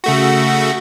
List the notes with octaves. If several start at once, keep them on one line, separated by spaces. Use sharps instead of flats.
C#3 A3 F#4